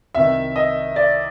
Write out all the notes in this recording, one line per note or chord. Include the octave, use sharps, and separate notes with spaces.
C2 C3 D#3 E5
D#5
D5